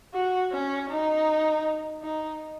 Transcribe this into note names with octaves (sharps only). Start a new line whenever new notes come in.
F#4
C#4
D#4
D#4